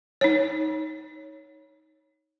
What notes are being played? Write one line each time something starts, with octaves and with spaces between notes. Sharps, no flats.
D#4 C#5